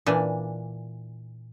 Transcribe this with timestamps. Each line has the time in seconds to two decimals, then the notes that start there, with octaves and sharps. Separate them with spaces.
0.06 A#2 E3 D4